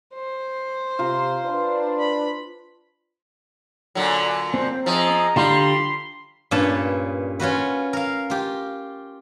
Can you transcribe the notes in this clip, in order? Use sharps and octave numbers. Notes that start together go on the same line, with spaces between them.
C5
C3 F4 A#5
D4 B4
B5
A#2 D3 F#3
C4 C5
F3 G#4 D#5 E5 A#5
D3 G3 F4 G4 B5 C6
G2 A#2 C#4 B4 A5
C#4 F4 F#4 B4
A#4 F5
F4 G4